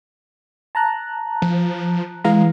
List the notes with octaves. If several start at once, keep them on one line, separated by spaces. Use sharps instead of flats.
A5 A#5 F#6
F3
E3 G#3 F5 A#5